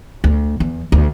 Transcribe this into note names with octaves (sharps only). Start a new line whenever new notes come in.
D2
E2
D2